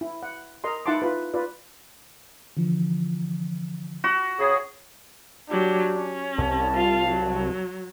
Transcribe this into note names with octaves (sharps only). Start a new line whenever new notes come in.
E4
F#5
A#4 D#5 A#5 C6
D#4 E4 F#5 A5 C6 D6
F4 B4
F4 B4 D5
D3 E3 F3
F#4
C#3 G#4
F#3 D4 G4
C#4
C2 A5
F4 F5
F#3